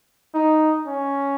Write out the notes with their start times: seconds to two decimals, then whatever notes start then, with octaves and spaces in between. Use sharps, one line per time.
0.34 D#4
0.87 C#4